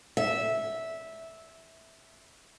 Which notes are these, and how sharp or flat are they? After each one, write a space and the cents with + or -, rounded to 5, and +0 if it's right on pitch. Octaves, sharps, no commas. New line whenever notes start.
E5 -10